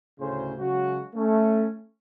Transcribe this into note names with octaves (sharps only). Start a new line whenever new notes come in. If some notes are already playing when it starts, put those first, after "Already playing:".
D2 A2 C#3 G#4 C5
C#3 F#3 G#3 F#4
A3 C#4